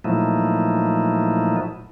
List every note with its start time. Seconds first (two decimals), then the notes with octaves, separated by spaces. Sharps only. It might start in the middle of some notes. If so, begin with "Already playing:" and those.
0.04 A#2 F3 F#3 A3 D#4 E4